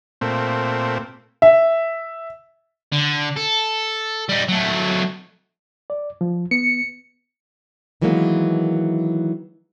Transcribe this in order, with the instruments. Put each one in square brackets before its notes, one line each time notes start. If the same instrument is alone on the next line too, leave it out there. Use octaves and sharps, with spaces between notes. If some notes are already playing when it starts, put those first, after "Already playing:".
[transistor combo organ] A#2 A3 C4
[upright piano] E5
[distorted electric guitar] D3
A4
G3 D#4
F#3 A3
[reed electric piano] D5
F3
[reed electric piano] B3 [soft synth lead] C#7
[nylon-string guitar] D#3 E3 F#3 G#3 A#3 B3